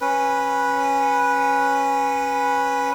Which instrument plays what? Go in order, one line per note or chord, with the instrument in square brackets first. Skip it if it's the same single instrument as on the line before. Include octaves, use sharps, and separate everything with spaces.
[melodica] C#4 B4